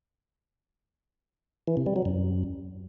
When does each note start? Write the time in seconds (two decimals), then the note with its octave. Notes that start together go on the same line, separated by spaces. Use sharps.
1.67 E3
1.77 C3
1.86 G3
1.96 F#3
2.05 F#2